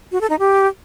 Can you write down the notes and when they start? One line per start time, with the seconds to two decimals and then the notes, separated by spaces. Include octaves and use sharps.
0.12 F#4
0.21 A4
0.30 D#4
0.39 G4